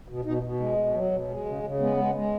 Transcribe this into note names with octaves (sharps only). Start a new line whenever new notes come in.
B2
B2 D#4
B2
G#3
B2
F#3
B2
G#3
C#3
C#3
G#3 B3
G#3
G#3